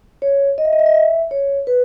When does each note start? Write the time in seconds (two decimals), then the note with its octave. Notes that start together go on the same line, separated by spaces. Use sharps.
0.22 C#5
0.58 D#5
0.65 E5
0.73 D#5
0.79 E5
0.86 D#5
0.94 E5
1.31 C#5
1.67 B4